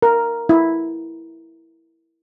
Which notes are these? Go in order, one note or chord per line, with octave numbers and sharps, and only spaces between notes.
A#4
E4